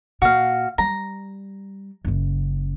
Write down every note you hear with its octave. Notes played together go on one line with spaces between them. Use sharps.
A#2 F#4 F5
G3 A#5
F#1 C#3